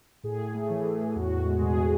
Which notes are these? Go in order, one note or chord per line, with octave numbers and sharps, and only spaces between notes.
A2 G#4
A2
A3
E3
A2
A2
E2 F#4
E2
G#3
B2 G#4